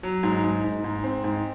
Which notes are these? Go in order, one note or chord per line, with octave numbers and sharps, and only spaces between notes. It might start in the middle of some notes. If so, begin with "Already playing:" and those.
F#3
G#2
G#2
G#2
G#2
C4
G#2